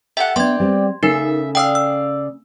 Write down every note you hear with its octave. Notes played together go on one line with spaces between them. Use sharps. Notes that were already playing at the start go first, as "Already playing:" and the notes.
G4 A4 E5 F#5
B3 D4 D5 G5 C6 G#6
G3 C4
C#3 A3 C#4 D#4 A#4 E5
D5 F5 G5 D#6 E6
E6